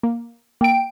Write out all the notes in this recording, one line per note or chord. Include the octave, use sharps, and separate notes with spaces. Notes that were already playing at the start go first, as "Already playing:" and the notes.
A#3
A#3 G5 D7